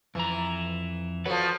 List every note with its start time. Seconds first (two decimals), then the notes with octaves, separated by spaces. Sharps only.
0.15 F2 E3 A#5
1.25 F3 F#3 A4 B4